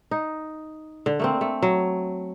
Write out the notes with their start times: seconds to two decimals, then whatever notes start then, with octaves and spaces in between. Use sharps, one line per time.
0.11 D#4
1.06 D3
1.20 A3 A#3 C4
1.41 A3
1.62 F#3